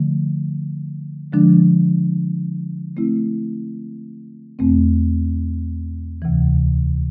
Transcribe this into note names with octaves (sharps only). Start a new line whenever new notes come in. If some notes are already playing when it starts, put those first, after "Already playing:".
Already playing: D3 F3 A3
D3 F3 G#3 D4
A3 C4 E4
E2 B2 A3 C4
D2 C3 E3